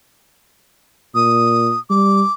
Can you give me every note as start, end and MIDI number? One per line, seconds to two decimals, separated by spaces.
1.15 1.73 46
1.15 1.79 87
1.90 2.22 55
1.90 2.33 86